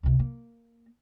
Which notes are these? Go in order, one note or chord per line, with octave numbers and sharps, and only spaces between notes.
C#2 C3
A#3